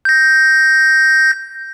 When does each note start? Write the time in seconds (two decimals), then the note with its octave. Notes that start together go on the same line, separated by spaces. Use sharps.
0.05 G6 A#6